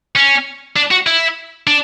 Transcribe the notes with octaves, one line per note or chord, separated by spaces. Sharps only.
C#4
D4
F#4
E4
D4